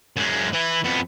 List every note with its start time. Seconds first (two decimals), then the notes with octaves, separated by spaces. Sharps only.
0.17 F#2 G#3
0.54 E3 E4
0.85 F2 B3